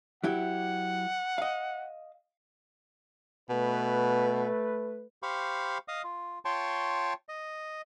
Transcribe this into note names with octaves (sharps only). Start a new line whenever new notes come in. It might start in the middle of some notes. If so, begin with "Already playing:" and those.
F#3 E4 G4 F#5
D#5 F5
B2 A3 B4
G4 C5 F5 B5 C#6
D#5 F5 D#6
F4
F4 C#5 G5 A5 C6 C#6
D#5